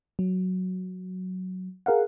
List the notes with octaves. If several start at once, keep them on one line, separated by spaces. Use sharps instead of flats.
F#3
G#4 A#4 F5 F#5